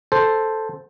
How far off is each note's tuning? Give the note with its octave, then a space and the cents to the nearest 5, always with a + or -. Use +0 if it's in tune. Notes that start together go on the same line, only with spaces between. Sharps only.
A4 +0 C5 +0